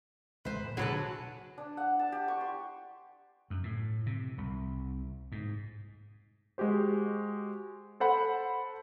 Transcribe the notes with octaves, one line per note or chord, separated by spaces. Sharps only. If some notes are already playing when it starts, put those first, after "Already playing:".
A1 G#3 B4 C5
A2 B3
A#2 D3 F#3 G#3 G#4 B4 A5
D4
F#5
A5
G4
C#6
C6
F#2
A2
C3
C2
G#2
G#3 F#4 G4 C5
A4 C5 F#5 B5